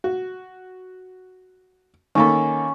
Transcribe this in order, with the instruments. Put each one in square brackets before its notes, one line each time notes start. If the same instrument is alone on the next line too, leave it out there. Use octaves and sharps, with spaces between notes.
[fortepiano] F#4
[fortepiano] D#3 A#3 A4 [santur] C#4 B5